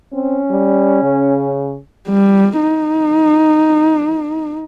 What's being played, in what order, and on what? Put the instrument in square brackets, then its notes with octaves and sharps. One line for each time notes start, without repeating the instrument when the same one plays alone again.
[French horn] C4 [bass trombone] C#4
[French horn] G3
C#3
[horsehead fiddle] G3
D#4